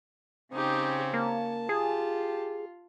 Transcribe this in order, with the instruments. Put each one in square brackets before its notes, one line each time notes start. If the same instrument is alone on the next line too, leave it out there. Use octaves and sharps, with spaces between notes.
[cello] C#3 C#4 [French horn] C4 [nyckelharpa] D#4 G4
[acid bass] A#3 [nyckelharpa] A5
[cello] F4 [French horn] G4 [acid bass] G#4